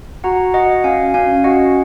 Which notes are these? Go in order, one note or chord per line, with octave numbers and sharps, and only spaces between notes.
F#4 F#5 A#5
F#4 D#5 F#5
C#4 F5 G#5
C#4 F5 G#5
F#4 D#5 F#5